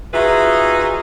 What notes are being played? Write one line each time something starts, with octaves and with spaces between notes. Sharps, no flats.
D#4 F4 F#4 G#4 B4 E5